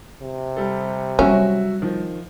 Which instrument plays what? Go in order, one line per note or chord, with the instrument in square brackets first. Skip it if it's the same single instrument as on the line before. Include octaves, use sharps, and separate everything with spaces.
[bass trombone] C3
[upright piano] G3 A4
[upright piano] F#3 F#4 E5 [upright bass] G3 C4 [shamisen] C#4
[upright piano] D#3 F3